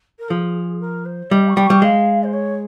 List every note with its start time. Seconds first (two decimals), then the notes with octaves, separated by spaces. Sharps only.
0.19 A#4
0.30 F3 G#4
0.81 A#4
1.05 C5
1.31 G3 D#5
1.49 C#6
1.57 G3
1.65 C#6
1.70 G3
1.82 G#3 F5
2.23 C5
2.33 C#5